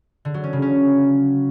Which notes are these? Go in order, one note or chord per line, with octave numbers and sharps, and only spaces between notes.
D3
F#3
C#4
C#3
C#4